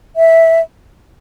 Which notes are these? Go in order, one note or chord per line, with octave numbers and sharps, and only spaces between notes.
E5